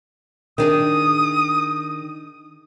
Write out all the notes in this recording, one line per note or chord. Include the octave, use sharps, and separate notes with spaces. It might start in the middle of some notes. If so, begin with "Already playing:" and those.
D#3 D4 G#4 D#6